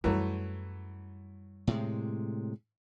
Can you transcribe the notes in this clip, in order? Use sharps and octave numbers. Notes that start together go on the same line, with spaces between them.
F#2 E3 F#3 G3 A3
A2 C3 G#3